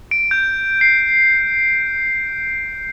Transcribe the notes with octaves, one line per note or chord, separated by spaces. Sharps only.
D7
G6
C7